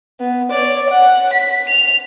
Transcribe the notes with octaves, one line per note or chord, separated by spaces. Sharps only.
B3
C#5 D5
F#5
B6
F7